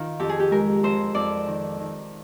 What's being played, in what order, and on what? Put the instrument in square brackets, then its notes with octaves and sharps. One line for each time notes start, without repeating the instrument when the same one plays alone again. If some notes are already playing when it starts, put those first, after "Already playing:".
Already playing: [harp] D#3 F4
F2 G4
G#4
G4
G#3 A#4
F2 C5
F2 D5
D#3
D#3